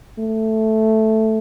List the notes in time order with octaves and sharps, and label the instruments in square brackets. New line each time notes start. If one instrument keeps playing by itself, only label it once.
[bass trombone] A3